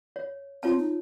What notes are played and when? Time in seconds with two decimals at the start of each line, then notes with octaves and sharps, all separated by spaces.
0.16 C#5
0.63 C4 F4 C#5 A5
0.79 D#4